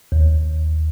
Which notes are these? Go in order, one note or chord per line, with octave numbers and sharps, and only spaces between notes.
D#2